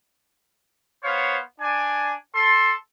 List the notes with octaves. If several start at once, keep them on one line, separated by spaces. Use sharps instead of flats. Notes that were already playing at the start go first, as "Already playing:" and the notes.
B3 C5 C#5 F5
D4 G#5
A4 C6